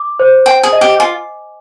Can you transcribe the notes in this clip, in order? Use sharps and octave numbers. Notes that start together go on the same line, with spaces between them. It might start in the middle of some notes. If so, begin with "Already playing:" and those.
Already playing: D6
C5
G5 G#5
G#4
D#5
G4
F4 G#5